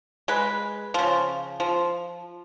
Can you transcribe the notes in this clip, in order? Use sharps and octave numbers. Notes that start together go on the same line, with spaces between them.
G#3 B4
C#3 F3
F3